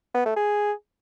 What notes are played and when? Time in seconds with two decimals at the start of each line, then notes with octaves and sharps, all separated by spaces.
0.14 B3
0.25 A3
0.36 G#4